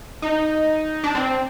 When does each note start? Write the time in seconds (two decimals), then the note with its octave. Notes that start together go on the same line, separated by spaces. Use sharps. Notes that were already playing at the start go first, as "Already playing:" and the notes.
0.22 D#4
1.04 D4
1.15 C4